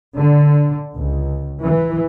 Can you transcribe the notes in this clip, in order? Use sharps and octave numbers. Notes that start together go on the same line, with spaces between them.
D3
C#2
E3